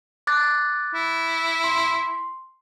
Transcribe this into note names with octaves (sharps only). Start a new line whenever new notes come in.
D6 F#6 A6
E4
C6